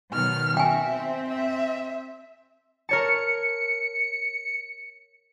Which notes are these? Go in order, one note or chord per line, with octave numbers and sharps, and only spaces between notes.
B2 D#3 F#3 F6
F#4 E5 G5 G#5
C4
E5
A#4 C#5 A5 C#7